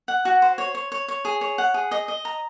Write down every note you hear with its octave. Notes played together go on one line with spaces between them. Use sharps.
F#5
F#4
C5
C#5
C#5
C#5
C#5
G#4
C#5
F#5
G#4
D#5
D#5
A#5